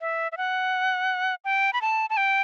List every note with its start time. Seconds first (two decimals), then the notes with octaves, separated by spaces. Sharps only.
0.01 E5
0.32 E5
0.37 F#5
1.45 G5
1.73 B5
1.82 A5
2.10 A5
2.17 G5